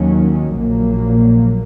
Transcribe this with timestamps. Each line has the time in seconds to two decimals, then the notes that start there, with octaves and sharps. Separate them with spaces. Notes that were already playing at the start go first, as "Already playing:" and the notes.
Already playing: D#2 D#3 F#3 C#4
0.56 A#1 A#2 F#3 A#3